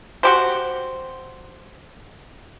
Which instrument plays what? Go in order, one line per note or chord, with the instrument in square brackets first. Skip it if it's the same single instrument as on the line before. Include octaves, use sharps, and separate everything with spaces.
[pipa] F#4 G4 C5